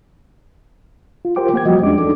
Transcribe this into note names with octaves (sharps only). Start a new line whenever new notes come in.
F4
F4 G4 A#4 C5 G5 D6
A#3 G5 G#6
F3 G3 F#4 D#5
E2 G#3 C#4 D4 D6
D4 D#4 A4